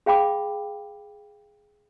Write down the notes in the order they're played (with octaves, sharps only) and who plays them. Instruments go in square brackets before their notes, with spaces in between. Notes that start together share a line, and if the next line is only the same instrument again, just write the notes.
[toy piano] G#4 F5 G5 B5 D6